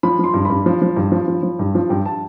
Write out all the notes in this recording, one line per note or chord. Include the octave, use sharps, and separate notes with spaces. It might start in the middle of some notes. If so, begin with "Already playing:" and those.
F3 B5
F3 C6
G2
G2 B5
F3
F3
G2
F3
F3
F3
G2
F3
G2 G5
A5